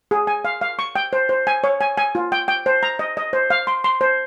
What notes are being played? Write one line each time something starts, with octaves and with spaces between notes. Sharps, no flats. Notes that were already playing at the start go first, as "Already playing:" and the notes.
G#4
G#5
F5
F5
C#6
G5
C5
C5
G#5
C#5
G#5
G#5
F4
G5
G5
C5
A#5
D#5
D#5
C5
F5
C6
C6
C5